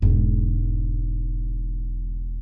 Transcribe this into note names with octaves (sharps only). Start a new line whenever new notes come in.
E1 G#2